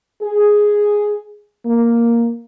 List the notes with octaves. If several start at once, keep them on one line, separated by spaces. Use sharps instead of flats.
G#4
A#3